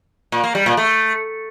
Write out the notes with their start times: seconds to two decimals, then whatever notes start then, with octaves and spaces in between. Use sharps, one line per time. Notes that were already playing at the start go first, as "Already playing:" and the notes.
0.32 A#2
0.44 A#3
0.55 G3
0.66 A#2
0.77 A3